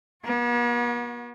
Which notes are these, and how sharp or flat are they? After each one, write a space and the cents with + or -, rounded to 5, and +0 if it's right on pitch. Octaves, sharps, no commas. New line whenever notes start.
B3 -45 F#4 -25